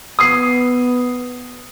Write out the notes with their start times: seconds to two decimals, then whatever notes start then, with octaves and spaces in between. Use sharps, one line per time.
0.19 B3 D#6 C7